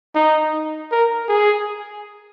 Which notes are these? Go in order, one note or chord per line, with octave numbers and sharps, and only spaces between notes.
D#4
A#4
G#4